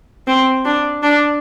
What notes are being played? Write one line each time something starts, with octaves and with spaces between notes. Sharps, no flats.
C4
D4
D4